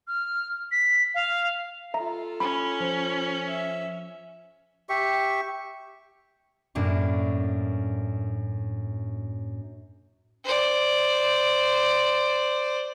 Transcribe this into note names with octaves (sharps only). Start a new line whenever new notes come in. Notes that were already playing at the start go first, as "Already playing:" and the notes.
F6
B6
F5
F4 A4 E5 A#5
C#4 B5
F3
E5
G4 E5 C#6
F#2 A2 F#3 A#3 C#4 D4
C5 D5